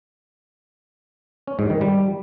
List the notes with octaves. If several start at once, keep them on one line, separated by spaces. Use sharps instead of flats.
C#4
G#2
D#3
G3